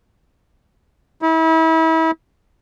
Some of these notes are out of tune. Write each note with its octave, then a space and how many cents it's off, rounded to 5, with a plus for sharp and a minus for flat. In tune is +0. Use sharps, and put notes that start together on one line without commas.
E4 -35